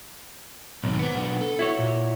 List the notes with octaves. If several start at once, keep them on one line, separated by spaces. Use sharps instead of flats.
B1 G#2 D#3
B3 C5 F#5
B1 D4
A4
E4 F#4 C#5
A#2